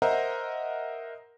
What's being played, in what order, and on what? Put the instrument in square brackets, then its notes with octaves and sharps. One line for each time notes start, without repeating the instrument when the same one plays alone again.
[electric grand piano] A#4 C5 D#5 E5 F#5 A#5